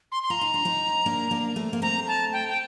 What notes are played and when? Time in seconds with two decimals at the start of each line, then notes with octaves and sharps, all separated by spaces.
0.12 C6
0.23 C6
0.30 F4 A#5
0.41 D#4
0.54 D4
0.65 C4 D#4
1.06 A#3 D4
1.31 A#3 D4
1.56 A3 C4
1.73 A#3
1.82 A3 C4 A#5
2.08 A5
2.33 G5
2.49 G5